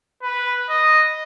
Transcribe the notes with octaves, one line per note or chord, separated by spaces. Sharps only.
B4
D#5